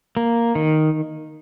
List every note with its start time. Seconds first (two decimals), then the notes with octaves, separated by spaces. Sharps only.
0.17 A#3
0.55 D#3